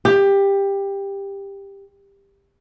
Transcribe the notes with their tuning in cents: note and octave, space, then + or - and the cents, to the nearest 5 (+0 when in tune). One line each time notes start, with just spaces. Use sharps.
G4 +15